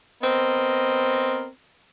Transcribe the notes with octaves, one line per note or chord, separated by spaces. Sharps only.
B3 C4 A#4 D#5